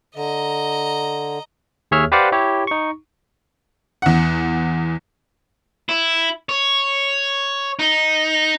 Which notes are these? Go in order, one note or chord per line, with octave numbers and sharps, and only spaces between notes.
D3 D#5 A#5
D#2 G#4 C#5 E5 F6
G4 B4 C5 D5 F5 F#5
E4 G4 C#5
D#4 C#6
E2 F#5
E4
C#5
D#4